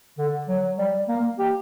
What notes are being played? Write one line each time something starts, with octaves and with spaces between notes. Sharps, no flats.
D3
F#3
G3
A#3
G4